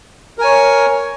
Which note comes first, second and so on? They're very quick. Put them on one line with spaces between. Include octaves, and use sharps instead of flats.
A#4 G#5 C#5